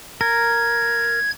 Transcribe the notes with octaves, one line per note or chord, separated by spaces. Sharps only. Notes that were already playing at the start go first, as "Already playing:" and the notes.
A#4 G#6